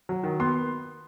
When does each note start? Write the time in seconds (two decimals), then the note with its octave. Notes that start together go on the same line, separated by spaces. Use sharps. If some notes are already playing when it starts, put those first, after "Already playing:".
0.09 F#3
0.23 D#3
0.40 B3 C6